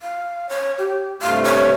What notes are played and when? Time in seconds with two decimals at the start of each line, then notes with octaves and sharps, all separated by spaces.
0.01 F5
0.49 C#5
0.78 G4
1.22 G2 C3 A3 F5
1.44 C#5